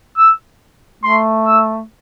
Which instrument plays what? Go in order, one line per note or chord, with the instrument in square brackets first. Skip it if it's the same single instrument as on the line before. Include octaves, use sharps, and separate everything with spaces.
[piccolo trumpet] E6
[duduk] A3 [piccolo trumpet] C6
[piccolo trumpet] E6